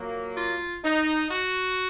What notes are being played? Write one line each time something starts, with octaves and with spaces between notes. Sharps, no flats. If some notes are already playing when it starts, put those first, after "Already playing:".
Already playing: A#2 F#3 A#3
F4
D#4
F#4